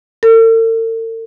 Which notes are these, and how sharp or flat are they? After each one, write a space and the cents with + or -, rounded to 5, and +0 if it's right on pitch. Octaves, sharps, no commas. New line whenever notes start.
A4 +45